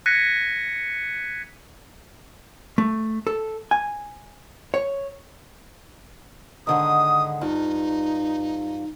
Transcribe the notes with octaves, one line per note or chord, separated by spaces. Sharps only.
F#6 G#6 A#6 B6 C#7 D#7
A3
A4
G#5
C#5
G#2 D3 D#3 D#6
G2 D#4 F4